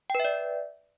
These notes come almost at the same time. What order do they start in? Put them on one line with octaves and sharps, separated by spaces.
G5 B4 E5 D5